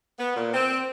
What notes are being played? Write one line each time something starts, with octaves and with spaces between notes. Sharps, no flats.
B3
A#2
C4